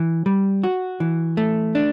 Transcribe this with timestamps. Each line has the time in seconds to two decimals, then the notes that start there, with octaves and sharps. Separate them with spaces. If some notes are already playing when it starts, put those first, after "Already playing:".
Already playing: E3
0.26 G3
0.64 F#4
1.00 E3
1.37 A3
1.75 D4